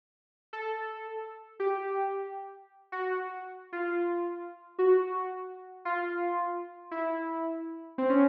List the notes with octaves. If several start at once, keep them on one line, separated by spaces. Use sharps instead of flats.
A4
G4
F#4
F4
F#4
F4
E4
C4
C#4